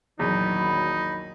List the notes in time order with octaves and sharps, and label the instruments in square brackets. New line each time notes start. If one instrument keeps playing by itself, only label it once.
[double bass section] A#1 D#3 F#3 [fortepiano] E2 [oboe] D#4 [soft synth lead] B5